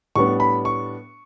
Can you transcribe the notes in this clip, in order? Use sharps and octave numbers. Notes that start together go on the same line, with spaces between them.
A2 G3 B3 D4 C#6
B5
C#6